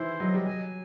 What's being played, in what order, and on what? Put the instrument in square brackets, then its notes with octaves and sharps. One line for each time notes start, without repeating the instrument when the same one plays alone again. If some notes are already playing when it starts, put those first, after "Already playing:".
Already playing: [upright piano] D#3 E3 [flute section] E4 C5
[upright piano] F#3 [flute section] D#5
[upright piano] G3
[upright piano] F#3 [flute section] G#5